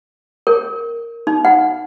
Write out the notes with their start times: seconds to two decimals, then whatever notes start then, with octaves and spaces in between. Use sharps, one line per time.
0.47 A#4
1.27 D#4
1.45 F#5